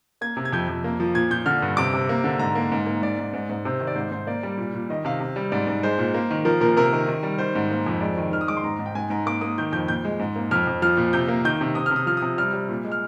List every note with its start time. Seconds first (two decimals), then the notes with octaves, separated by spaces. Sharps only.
0.21 A#3 G#6
0.37 C3
0.45 G#6
0.53 F2 G6
0.69 F2
0.84 A#3
1.00 F3
1.15 A#2 G#6
1.31 A#2 G6
1.46 D3 F6
1.62 G2
1.77 C3 D6
1.93 C3
2.09 A#3
2.24 D3
2.39 G#2 A#5
2.55 A#3
2.72 G#2
2.86 A#3
3.02 G#2 D5
3.19 G#2
3.33 G#2
3.50 G#2
3.65 C3 C5
3.80 D#3
3.87 D5
3.96 G#2 C5
4.12 G#2 C5
4.27 A#3 D5
4.43 G3
4.58 A#2
4.74 A#2
4.90 D#3 D#5
5.05 C3 F5
5.20 C3
5.36 G3
5.52 G#2 D5
5.67 G#2
5.83 G#3 C5
5.98 A#2
6.14 A#3
6.30 D#3
6.45 F3 A#4
6.61 A#2 A#4
6.77 C3 A#4
6.92 D#3
7.07 D#3
7.23 G3
7.38 D#3 C5
7.55 G#2
7.71 A#3
7.86 F2
8.01 G#3 D5
8.18 D#3
8.32 D#3 F6
8.41 D#6
8.48 G#3 D6
8.57 C6
8.64 G#2 A#5
8.79 G#2
8.86 G5
8.95 G#2 G#5
9.10 G#2 A#5
9.26 A#3 D6
9.41 A#3 D#6
9.58 D#3 G6
9.73 F2 G6
9.88 A#2 G6
10.05 G#3
10.20 G#2
10.36 A#3
10.51 F2 F6
10.67 F2
10.82 F3 F6
10.97 A#2
11.13 C3 G6
11.28 A#3
11.44 D#3 G6
11.61 C3
11.75 C3 D#6
11.86 C3 F6
11.96 D#6
12.06 F3 F6
12.17 C3 D#6
12.38 G3 F6
12.53 G3
12.69 A#2
12.85 G#3
12.92 F6